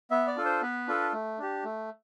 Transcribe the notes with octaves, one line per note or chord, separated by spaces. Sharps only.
B3 E5
D5
D4 F4 A4
C5
B3 B4
D4 F4 A4
A3
D4 G4
A3